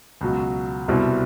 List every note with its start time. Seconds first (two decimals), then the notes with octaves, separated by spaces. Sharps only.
0.21 C#2 B2 F#3
0.88 C2 B2 G3 C4 E4